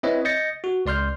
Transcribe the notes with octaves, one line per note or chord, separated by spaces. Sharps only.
C4 E4 B4 C#5 D#5 E5
D#5 G6 A6 A#6 C#7
F#4
C#2 D5 C6 F6 G6